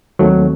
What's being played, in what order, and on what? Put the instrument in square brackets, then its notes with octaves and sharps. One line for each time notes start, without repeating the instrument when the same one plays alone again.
[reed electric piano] D#2 D#3 A3 C4 [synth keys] F#3